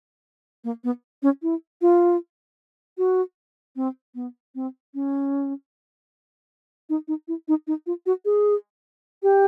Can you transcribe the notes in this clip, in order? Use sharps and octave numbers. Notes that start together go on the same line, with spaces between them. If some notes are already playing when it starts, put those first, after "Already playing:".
A#3
B3
C#4
E4
F4
F#4
C4
B3
C4
C#4
D#4
D#4
E4
D#4
D#4
F4
F#4
G#4
G4